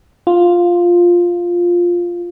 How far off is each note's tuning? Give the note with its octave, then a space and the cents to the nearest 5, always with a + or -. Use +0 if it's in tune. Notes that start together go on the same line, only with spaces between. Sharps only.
F4 +5